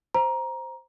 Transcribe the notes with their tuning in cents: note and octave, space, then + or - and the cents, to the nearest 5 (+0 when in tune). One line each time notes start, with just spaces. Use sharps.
C5 +0 A#5 +15